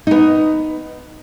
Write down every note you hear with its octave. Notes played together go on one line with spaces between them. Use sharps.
B3 D#4